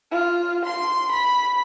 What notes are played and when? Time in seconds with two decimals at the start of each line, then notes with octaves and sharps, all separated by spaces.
0.11 F4
0.66 C6
1.12 B5